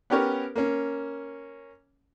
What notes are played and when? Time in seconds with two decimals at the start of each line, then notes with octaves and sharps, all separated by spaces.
0.10 B3 C#4 G4 A#4 C#5
0.56 A#3 C#4